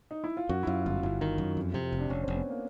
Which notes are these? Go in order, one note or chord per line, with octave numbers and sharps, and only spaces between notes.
D#4
E4
F4
F#2 F#4
E4
F#2 F4
G1 F4
G1 E4
D#3
F#2
F2
C3
F1
D4
F1 C#4
F1 C4
B3
A#3